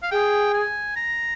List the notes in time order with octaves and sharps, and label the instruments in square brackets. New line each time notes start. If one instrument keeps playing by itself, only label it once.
[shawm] F5
[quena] G#4 [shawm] G5
[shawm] G#5
A#5